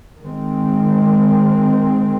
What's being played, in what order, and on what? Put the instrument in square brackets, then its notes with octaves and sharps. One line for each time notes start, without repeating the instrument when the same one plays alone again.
[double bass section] D#3 G#3 C4